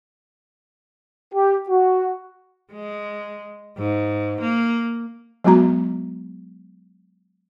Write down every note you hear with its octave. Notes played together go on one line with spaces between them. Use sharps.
G4
F#4
G#3
G#2
A#3
F#3 G#3 B3 F#4 A#5